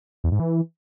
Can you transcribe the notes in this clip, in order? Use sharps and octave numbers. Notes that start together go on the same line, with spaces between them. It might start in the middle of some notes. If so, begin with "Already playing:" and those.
E2
G#2
E3